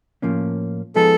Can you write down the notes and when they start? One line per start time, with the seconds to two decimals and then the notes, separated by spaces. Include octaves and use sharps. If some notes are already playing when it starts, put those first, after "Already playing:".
0.22 A2 F3 A#3 C#4
0.96 F3 G#3 B3 D#4 G#4 A4